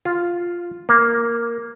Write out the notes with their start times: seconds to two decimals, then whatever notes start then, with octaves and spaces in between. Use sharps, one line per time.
0.05 F4
0.89 A#3